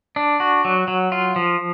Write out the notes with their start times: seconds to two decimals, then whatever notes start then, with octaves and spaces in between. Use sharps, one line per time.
0.16 D4
0.40 F#4
0.65 F#3
0.88 F#3
1.12 F4
1.36 F3